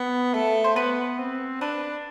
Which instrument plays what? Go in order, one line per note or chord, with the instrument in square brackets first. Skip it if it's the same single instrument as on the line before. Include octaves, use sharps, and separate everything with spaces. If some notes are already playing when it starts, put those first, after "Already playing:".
Already playing: [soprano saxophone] B3
[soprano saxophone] A3 [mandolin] A4
[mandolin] C5
[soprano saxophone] B3 [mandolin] B4
[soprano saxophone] C4
[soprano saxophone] D4 [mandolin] B4